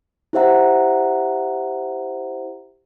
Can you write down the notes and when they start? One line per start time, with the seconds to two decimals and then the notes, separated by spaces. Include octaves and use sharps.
0.33 E4 G4 C5 E5 F#5 A#5